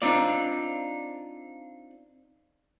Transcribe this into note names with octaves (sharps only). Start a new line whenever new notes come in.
C4 D4 D#4 F4 D5